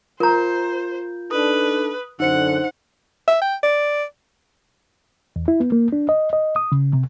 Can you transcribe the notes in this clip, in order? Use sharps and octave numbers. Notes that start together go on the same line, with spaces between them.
F4 A#4 C5 A#5 G6
D4 D#4 A4 B4 D#6
F#2 D3 D#4 C5 F#5 C#7
E5
G5
D5
E2
E4
B3
A#3
D4
D#5
D#5
D#6
C#3
C3